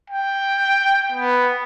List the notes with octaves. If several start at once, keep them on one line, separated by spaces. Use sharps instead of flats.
G5
B3